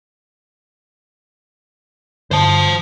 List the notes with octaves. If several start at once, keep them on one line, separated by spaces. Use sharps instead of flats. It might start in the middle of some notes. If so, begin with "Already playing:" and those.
G2 D3 C5 A5